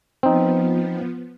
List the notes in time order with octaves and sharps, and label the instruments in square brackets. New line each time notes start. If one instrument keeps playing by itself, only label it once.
[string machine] F3 B3 [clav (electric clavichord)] C4 D#4